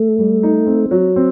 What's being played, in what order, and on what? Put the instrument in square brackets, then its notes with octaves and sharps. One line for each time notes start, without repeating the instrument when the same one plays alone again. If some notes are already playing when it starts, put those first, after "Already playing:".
Already playing: [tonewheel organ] A3
[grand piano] G3
D#4
C4
F#3
C4